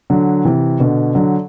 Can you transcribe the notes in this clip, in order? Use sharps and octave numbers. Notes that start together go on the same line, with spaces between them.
D3 F#3
C3 E3
B2 D3
D3 F#3